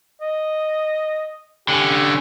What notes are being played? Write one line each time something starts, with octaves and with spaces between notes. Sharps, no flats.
D#5
D3 C#4 G4